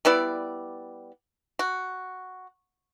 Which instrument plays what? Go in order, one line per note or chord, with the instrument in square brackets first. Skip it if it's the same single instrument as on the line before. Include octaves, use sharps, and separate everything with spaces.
[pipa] G3 B3 E4 D5
F#4